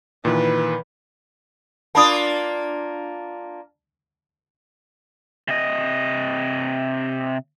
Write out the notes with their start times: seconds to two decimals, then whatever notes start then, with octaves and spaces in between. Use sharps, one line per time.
0.25 A#2 D#3 E3 B4
1.95 A#3 D4 F4 A5 B5 D#6
5.48 C3 D#5